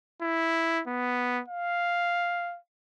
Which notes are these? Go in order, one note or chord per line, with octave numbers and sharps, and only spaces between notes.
E4
B3
F5